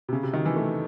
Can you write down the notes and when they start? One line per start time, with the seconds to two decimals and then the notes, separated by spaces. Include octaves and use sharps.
0.09 C3
0.13 C#3
0.23 C3
0.34 D#3
0.45 E3
0.56 A3